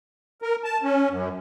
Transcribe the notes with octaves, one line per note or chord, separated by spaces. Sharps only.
A#4
A5
C#4
F#2